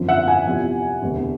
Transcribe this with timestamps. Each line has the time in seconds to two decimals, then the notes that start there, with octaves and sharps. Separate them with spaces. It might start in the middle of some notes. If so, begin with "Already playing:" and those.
Already playing: G#1 F#2 D3 F3
0.08 E5 F#5
0.28 F#5 G#5
0.46 E2 C3 F3
1.02 E1 D2 C3